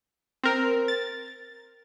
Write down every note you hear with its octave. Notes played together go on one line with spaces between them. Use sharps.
C4 A#4
A6